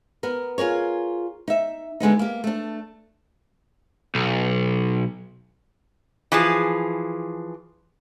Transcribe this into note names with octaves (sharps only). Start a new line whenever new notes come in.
B3 A#4
F4 G#4 A#4 C#5
D#4 E5
D3 G#3 B3 D#4
A#3 G4
A3 D4
B1
E3 F3 G#4